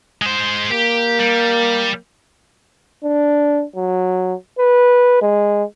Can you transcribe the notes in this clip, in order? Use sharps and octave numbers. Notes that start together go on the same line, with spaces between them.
G#3 C5
A#3 G4
G3
D4
F#3
B4
G#3